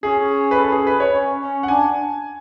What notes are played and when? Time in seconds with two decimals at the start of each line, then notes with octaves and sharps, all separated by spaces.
0.03 C#4 G#4
0.51 B4
0.58 A4
0.72 G#4
0.87 B4
1.00 C#5
1.14 C#4
1.41 C#4
1.63 F#5
1.68 D4 G#5